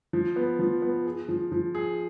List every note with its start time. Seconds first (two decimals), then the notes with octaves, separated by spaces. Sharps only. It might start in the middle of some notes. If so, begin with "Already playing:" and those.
0.13 F3
0.36 B3
0.59 F3
0.82 B3
1.05 G#4
1.28 F3
1.52 F3
1.75 G#4